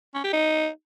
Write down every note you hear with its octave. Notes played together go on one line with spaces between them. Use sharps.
C#4
G4
D#4